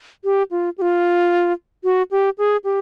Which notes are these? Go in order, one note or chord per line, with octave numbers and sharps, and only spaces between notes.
G4
F4
G4
F4
F#4
G4
G#4
G4